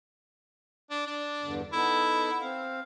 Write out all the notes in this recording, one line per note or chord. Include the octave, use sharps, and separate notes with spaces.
D4
D4
E2 G2 D3
B3 D#4 E4 A4
C4 F5